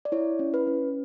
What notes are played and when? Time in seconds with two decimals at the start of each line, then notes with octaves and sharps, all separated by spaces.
0.05 D5
0.12 E4 C#5
0.39 C#4
0.54 B4
0.67 C#4